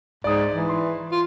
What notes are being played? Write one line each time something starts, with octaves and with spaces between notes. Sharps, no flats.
G#2 D5 D#6
E3
C6
F4